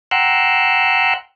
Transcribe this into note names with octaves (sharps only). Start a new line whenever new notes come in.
F#5 G5 A#5 C6 E6 F#6